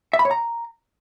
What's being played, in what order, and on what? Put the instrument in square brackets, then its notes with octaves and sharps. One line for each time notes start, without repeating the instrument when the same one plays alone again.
[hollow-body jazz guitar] E5
B5
C#5
A#5